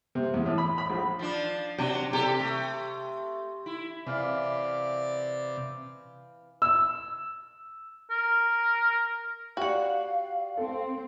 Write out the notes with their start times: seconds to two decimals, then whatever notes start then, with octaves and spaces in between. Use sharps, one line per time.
0.15 C3
0.34 E2
0.46 A2
0.58 B5
0.78 B5
0.90 A#1
1.19 F3 D4
1.78 C3 F#3 D4
2.13 C3 G4 A4
2.40 A3
3.66 E4
4.06 C3 E3 D5 F5 B5
6.62 E6
8.10 A#4
9.57 F#4 G4 D5 F5 F#5
10.57 C4 A4